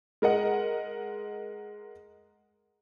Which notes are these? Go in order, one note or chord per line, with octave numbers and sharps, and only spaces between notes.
G#3 A#4 D#5 F#5